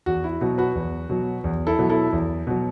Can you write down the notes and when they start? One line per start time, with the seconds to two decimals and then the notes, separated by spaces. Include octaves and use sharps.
0.06 E2 F#4
0.24 E4
0.41 B2 F#3 F#4
0.58 F#4 B4
0.75 E2
1.09 B2 F#3
1.44 E2
1.67 E4 A4
1.79 B2 F#3
1.90 E4 A4
2.13 E2
2.47 B2 F#3